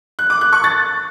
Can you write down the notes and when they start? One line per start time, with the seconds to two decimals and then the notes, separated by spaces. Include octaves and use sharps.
0.19 F#6
0.30 D6
0.41 F#6
0.53 C#6
0.64 A6